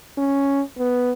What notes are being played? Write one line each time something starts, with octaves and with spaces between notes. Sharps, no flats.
C#4
B3